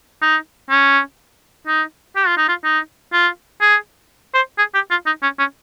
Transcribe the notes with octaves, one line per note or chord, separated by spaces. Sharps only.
D#4
C#4
D#4
G4
F4
D#4
F4
D#4
F4
G#4
C5
G#4
G4
F4
D#4
C#4
C#4